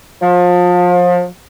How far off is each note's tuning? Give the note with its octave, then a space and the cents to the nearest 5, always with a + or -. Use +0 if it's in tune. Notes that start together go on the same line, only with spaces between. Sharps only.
F3 +30